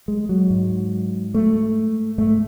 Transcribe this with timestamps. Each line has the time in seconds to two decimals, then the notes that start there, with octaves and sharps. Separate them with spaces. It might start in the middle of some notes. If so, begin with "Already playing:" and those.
0.08 G#3
0.29 F#3
0.50 G#2
1.34 A3
2.18 G#2 A3